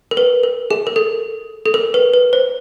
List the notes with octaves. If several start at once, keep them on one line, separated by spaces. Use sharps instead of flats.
A#4
B4
A#4
G#4
A#4
A4
A4
A#4
B4
B4
C5